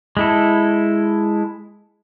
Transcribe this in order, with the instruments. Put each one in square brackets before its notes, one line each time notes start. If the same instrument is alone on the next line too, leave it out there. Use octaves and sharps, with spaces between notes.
[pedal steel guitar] G#3 E4 A4